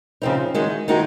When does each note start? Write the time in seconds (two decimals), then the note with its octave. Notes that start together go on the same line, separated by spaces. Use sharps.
0.22 C#3 F3 C4 D#4
0.54 D#3 G#3 D#4 F#4
0.88 D#3 G#3 D#4 F#4